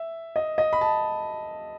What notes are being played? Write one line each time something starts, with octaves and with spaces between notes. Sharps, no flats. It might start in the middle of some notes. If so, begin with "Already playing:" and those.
Already playing: E5
D#5
D#5
B5
A5